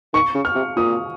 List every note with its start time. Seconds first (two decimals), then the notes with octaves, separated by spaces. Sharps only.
0.14 D#3 C#6
0.35 C#3
0.45 F6
0.55 C3
0.77 A#2 D#6